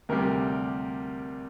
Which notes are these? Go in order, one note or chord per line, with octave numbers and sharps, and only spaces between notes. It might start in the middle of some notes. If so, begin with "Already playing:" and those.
D2 C3 G3 A#4